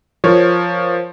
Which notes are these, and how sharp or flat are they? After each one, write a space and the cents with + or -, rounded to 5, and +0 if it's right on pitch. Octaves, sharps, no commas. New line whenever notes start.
F3 +0 A#4 +0 C#5 +0